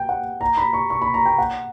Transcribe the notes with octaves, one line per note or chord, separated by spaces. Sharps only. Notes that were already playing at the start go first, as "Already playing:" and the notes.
Already playing: G5
F#5
A#5
B5
C#6
C#6
B5
A#5
G5
F#5